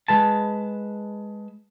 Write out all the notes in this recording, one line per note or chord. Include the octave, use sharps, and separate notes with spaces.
G#3 B4 A5